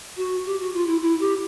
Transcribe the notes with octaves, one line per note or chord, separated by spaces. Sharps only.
F#4
G4
F#4
F4
E4
E4
G4